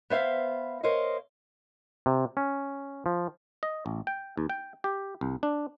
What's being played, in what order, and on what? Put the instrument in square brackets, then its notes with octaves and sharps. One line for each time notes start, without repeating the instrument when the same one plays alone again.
[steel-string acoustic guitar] B3 C5 E5 F5
A#4 C5 C#5 D#5 F5
[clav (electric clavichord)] C3
C#4
F3
D#5
A1
G5
D#2
G5
G4
C2
D4